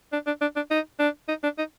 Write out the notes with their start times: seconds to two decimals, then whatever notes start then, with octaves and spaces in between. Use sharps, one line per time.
0.13 D4
0.27 D4
0.41 D4
0.56 D4
0.71 D#4
0.99 D4
1.28 D#4
1.43 D4
1.58 D#4